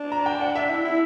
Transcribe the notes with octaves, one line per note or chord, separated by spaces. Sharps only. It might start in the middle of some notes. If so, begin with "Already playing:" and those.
Already playing: D4
A#5
G5
F#5
E5
E4
E4